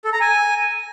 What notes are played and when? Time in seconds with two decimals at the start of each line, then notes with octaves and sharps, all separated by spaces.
0.05 A4
0.13 A#5
0.21 G#5